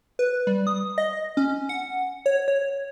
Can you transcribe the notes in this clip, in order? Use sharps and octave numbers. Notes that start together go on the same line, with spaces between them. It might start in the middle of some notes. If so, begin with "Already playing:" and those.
B4
G3
D#6
D#5
C#4
F#5
C#5
C#5